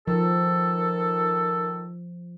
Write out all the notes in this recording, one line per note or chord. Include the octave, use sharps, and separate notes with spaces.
D#3 F3 A4